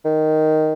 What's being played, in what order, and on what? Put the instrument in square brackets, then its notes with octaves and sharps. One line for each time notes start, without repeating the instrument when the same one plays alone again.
[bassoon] D#3